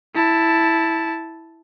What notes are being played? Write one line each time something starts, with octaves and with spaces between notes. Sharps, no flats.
E4 A5